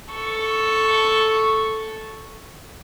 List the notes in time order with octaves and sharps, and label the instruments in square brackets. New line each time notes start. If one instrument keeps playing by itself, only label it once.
[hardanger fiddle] A4 C#6